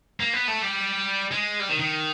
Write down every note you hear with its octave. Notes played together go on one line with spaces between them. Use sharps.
A#3
B3
A3
G3
G#3
G3
D#3
D#3